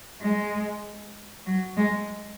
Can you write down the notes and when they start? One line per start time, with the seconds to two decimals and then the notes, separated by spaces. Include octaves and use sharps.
0.21 G#3
1.46 F#3
1.77 G#3